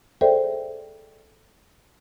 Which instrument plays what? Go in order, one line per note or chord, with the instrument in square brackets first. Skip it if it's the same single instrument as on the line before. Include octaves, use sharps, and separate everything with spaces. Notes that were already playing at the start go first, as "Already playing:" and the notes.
[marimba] G#4 A4 C5 D5 E5 G5